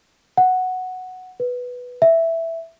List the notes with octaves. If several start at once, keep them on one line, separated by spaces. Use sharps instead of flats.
F#5
B4
E5